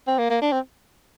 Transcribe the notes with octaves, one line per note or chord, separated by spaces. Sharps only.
C4
A#3
A#3
D4
C4